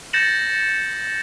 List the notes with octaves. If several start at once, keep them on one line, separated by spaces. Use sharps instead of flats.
G6 A6 A#6 C#7 E7 F#7